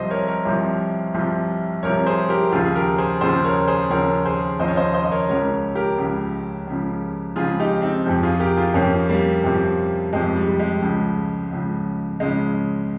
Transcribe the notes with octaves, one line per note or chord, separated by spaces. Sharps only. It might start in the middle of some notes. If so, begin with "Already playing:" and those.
Already playing: C2 C3 F3 C5 D#5
A#4 C#5
A#4 C#5
C2 C3 F3
C2 C3 F3
C2 C3 F3 A#4 C#5
G#4 C5
G4 A#4
D#2 C#3 F3 F4 G#4
G#4
G4 A#4
G#4 C5
D#2 C#3 F3 G#4 C5
A#4 C#5
G#4 C5
D#2 C#3 F3 A#4 C#5
G#4 C5
D#2 C#3 F3 C5 D#5
C#5
C5 D#5
C5 D#5
D#5
A#4 C#5
C#2 C#3 F3 A#4 C#5
G4 A#4
C#2 C#3 F3
C#2 C#3 F3
C#2 C#3 F3 F4 G#4
D#4 G4
C4 D#4
F2 C3 F3
F4 G#4
G4 A#4
F4 G#4
F2 C3 F3 A#3 C#4
G3 A#3
F2 C3 F3
F2 C3 F3 G#3
G3
G3
G#3
C#2 C#3 F3
C#2 C#3 F3
C#2 C#3 F3 G#3